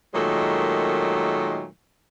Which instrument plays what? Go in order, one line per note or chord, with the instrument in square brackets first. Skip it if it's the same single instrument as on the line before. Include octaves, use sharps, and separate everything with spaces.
[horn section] A#2 D#3 F#3 G#3 A3